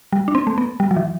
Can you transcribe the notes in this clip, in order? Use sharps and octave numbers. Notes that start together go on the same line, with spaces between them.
G3
D4
C4
A3
B3
G3
F#3
E3